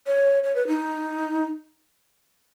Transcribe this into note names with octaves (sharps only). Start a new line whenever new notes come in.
C#5
C#5
B4
D#4